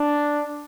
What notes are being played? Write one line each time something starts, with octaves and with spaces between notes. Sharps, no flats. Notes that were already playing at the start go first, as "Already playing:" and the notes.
Already playing: D4